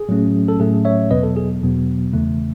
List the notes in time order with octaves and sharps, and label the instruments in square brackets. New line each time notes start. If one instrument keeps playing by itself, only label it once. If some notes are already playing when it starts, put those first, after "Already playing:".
Already playing: [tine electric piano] G#4
A2 F#3 A3 C#4
A4
A2 F#3 A3 C#4 G#4
C#5 E5
E2 B2 F#3 B3 B4 D#5
A4
G#4
E2 B2 F#3 B3
E2 C#3 E3 A3